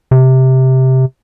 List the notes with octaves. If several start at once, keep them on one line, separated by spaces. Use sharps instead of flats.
C3